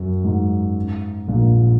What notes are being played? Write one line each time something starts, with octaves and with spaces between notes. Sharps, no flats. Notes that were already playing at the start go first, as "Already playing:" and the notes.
Already playing: F#2
G#2
A#1 A#2